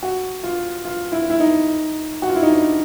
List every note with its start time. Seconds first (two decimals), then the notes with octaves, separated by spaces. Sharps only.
0.03 F#4
0.43 F4
0.85 F4
1.12 E4
1.30 E4
1.40 D#4
2.22 F#4
2.29 F4
2.36 E4
2.43 D#4
2.50 D4